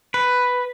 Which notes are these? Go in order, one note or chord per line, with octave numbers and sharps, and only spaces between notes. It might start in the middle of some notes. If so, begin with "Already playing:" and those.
B4